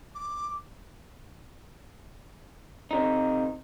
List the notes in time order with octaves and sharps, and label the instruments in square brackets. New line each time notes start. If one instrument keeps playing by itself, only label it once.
[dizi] D6
[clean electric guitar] C3 D#4